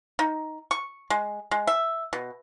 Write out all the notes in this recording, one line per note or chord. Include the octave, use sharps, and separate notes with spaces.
D#4
C#6
G#3
G#3
E5
B2